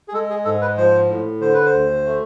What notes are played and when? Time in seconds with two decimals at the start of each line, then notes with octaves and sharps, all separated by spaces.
0.08 G#4
0.13 G#3 A4
0.30 G#4
0.45 G#2 A4
0.61 B4
0.77 F3 C5
1.09 A2
1.41 D3 C5
1.54 B4
1.66 C5
1.73 D2
2.05 A3